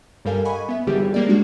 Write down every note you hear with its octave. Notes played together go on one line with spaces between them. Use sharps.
G2 G3 A4 A#4 F5 G#5
D#5 F#5 G#5 B5 C#6
B3 E5
G#1 D3 E3 G3 G4 G#4
G3 A#3 D5
G#3 A#3 D4 F#4